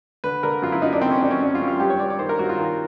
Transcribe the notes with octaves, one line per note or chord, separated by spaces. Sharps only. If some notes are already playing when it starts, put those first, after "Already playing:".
D3 B4
D3 A#4
F#2 F4
E4
F#2 D#4
D4
D3 C4
C#4
F#2 D4
C#4
F#2 D4
F4
F#2
F4
G2 G4
C#5
G2 D5
D5
D#3 C5
A#4
G2 F#4
F4
D#3